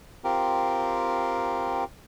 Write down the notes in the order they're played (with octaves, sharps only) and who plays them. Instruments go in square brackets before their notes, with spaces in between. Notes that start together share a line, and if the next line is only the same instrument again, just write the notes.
[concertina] C4 F4 G4 A#4